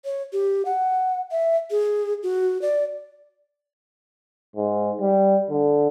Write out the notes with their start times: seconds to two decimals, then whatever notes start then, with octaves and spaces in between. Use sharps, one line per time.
0.05 C#5
0.33 G4
0.65 F#5
1.31 E5
1.71 G#4
2.23 F#4
2.62 D5
4.56 G#2
5.01 G3
5.50 D3